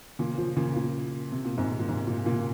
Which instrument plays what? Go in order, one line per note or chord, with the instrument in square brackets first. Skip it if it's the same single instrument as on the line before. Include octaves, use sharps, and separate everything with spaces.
[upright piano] A#2 C#3
C#3 F3
A#2 C#3
A#2
C3
A#2
G#2 C3
C3
A#2
G#2
A#2
A#2 C#3